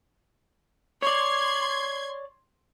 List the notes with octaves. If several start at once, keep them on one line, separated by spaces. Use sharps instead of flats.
C#5 D5 C6 G#6